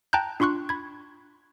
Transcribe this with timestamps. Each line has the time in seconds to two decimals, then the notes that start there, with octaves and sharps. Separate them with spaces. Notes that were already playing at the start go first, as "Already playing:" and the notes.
0.13 G5 A5 A#5 F#6 G6
0.40 D4 F4 C6 C#6 F#6
0.69 B5 G#6